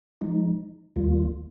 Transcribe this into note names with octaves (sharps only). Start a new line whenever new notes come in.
F3 G#3 D#4
D#2 D#3 G3 A#3 F4